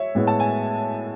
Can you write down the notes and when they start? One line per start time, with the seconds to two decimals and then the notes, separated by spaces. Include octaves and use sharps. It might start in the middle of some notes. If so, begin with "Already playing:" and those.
Already playing: C#5 E5
0.15 A2 G#3 B3
0.27 A5
0.40 G#5